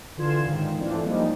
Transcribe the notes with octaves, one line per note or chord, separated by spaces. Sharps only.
D3 E3 F4 C6 G#6 E7
G#2 D#3
E3 A3 C4 D4 F4
F3 G3 G#3 A#3 D#4